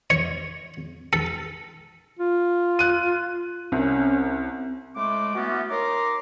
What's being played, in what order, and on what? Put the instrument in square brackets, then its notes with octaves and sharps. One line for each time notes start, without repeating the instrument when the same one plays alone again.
[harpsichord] C#5
A4
[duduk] F4
[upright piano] F#6 D#7
[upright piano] C2 [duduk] C#4
[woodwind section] A2 G#3 A3 D6
E3 A3 B3 C#4 F4 F#4
D#4 A#4 C#5 A#5 C6 D6